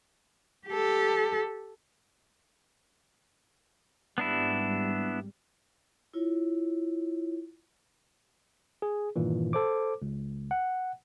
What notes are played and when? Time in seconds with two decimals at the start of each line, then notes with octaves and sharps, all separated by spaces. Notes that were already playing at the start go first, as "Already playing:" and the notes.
0.68 G4 A4
4.18 G#1 G3 B3 D4 E4
6.14 E4 F4 C#5
8.82 G#4
9.16 G2 A#2 D#3 E3
9.53 A4 C5 D6
10.02 C#2
10.51 F#5